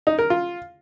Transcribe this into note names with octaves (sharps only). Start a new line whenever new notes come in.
D#4
A#4
F4